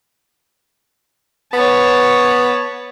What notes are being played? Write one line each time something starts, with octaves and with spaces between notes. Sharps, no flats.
B3 C#5 A5